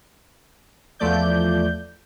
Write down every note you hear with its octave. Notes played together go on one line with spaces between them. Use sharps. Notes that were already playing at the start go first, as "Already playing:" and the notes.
E2 F3 A3 D5 G6